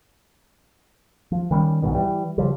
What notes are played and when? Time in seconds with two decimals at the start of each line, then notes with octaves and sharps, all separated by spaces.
1.32 F3
1.51 D#3 G3 C4 C#4
1.82 C2 G#2 B2 D#3
1.95 E3 G3
2.38 C#3 F3 G3